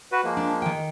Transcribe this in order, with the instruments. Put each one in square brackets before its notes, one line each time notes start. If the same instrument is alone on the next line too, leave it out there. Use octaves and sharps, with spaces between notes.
[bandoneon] F#4 B4
F3 G#3 A#3
[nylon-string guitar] D4
D#3 G5